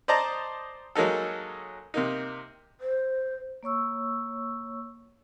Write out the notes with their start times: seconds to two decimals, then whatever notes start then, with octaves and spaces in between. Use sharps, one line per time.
0.08 C5 D5 D#5 A5 A#5
0.95 F#3 G#3 A#3 D#4 A4
1.94 C3 A#3 D#4
2.81 C5
3.63 A#3 C#5 C#6 E6